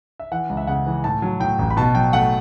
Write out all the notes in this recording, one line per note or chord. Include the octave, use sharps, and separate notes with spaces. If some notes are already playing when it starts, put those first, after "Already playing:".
E5
E3 F#5
C#2
E5
C#3 F#5
E3
A2 A5
F#3
A2 G5
A1
B5
B2 A5
F#3 G5
A3 F#5